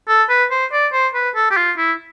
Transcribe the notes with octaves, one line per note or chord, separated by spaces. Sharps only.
A4
B4
C5
D5
C5
B4
A4
G4
F4
E4